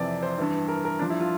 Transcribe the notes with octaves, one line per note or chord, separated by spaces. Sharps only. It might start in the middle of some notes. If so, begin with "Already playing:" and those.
Already playing: F2 C3 E3 D5
C5
G2 E3
A#4
A#4
G2 F3 D4
E4
F4